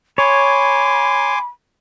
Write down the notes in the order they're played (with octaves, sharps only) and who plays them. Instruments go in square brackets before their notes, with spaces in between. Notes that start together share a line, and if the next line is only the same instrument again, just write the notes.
[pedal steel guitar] C#5 [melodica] G#5 C6 D6 [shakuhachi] B5